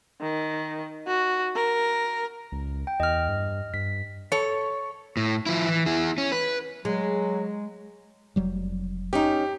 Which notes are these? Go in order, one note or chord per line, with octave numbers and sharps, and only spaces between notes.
D#3
F#4
A#4
C#2
G5
E2 D#5 F6
G2
G2 B6
A4 C#5
A2
F3 E4
E3
E4 G#4
C#4
B4
F#3 G#3
F1 F#3 G3
C#4 D#4 G4